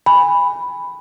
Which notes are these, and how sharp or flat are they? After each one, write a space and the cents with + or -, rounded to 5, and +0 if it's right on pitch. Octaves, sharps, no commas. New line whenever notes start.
G#5 -30 B5 +0